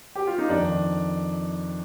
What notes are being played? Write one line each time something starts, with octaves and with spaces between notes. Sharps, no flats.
G4
F4
D#4
F2 D#3 D4